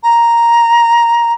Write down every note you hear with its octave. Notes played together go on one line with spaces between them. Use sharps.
A#5